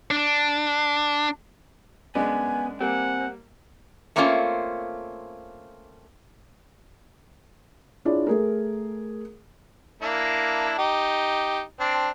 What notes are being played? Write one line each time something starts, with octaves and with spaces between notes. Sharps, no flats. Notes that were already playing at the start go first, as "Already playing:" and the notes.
D4
F#2 G#3 B3 D4 G#5
G3 A#3 C4 F#5 G#5
A3 A#3 C4 C#4 F4
D4 E4 F4 G#4 C#5 D5
A3 G#4 A#4
A#3 D4 E4
D#4 G4
C4 D4